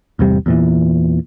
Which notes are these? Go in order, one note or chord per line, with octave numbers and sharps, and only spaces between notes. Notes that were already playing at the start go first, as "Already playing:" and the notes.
A1 E2 C3 G3
E2 A#2 E3